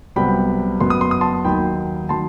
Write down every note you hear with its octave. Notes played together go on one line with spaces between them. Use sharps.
C2 C3 F#3 B3 G5 B5
F#1 F#2 F#3 B3 C6
D#6
C6
D#6
A5 C6
D#2 D#3 F#3 G5 B5
D#3 F#3 A5 C6